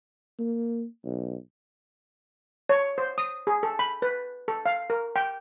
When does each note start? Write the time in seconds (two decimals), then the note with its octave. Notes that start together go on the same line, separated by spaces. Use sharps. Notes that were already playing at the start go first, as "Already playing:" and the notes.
0.39 A#3
1.04 B1
2.69 C#5
2.98 C5
3.18 D#6
3.47 G#4
3.63 A4
3.79 B5
4.02 B4
4.48 A4
4.66 F5
4.90 A#4
5.16 G5